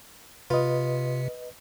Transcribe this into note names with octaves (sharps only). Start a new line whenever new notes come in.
C3 F4 B4 D#5